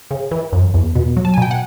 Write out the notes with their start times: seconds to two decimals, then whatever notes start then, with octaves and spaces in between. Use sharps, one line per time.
0.11 C#3
0.31 E3
0.53 F#2
0.74 E2
0.95 B2
1.17 F#3
1.25 A5
1.34 G#5
1.38 B2 G5
1.51 F#5